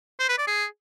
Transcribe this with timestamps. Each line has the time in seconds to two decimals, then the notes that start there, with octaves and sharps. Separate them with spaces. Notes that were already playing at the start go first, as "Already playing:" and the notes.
0.20 C5
0.29 B4
0.38 D5
0.47 G#4